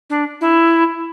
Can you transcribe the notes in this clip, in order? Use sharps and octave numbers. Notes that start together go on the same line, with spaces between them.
D4
E4